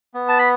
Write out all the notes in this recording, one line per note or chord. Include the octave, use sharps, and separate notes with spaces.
B3
A5
B5